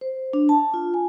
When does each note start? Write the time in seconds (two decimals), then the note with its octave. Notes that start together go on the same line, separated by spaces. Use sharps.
0.01 C5
0.33 D4
0.49 A5
0.74 F4
0.94 G#5